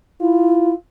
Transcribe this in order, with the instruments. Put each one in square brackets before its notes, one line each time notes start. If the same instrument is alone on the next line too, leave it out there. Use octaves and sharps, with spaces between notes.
[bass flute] E4 [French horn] F4